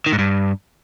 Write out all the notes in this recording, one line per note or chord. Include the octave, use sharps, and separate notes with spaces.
D#3
G#2
G2